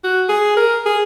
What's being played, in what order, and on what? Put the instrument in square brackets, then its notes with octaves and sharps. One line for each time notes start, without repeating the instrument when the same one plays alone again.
[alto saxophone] F#4
G#4
A#4
G#4